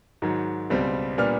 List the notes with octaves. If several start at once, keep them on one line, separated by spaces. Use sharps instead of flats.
G#2 D#3 F#3
C#2 B2 G3 C4
A#2 G3 B3 D4 F6